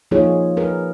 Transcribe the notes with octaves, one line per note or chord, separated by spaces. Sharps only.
F3 A#3 D#4 F4 G#4 C#5
G#4 A#4 B4